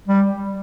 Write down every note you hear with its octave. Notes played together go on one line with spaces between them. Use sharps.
G3